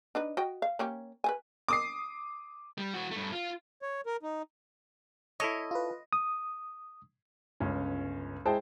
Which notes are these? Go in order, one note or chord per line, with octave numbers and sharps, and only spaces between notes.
D4 D#4 B4
F#4 D#5 G5
F5
A#3 C#4 G4
B4 C5 G#5
D6 D#6 C7
G3
E3 F#4
G2 A3
F4
C#5
A#4
D#4
E4 A4 C#5 D#5
F4 B4
D#6
G1 C#2 C#4
G#3 E4 G#4 C5 G5 A5